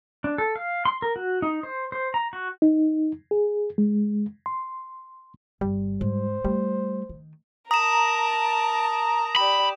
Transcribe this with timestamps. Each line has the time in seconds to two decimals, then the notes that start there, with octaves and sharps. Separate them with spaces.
0.24 D4
0.38 A4
0.56 F5
0.85 C6
1.02 A#4
1.16 F#4
1.42 D#4
1.63 C5
1.92 C5
2.14 A#5
2.33 F#4
2.62 D#4
3.31 G#4
3.78 G#3
4.46 C6
5.61 G1 G3
6.01 G#2 C5
6.45 G3 A3
7.09 D#3
7.71 A#4 A5 A#5 D#6 E7
9.36 G4 D5 B5